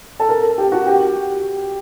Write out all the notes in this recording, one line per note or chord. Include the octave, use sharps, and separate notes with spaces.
A4
A#4
G4
F#4
G4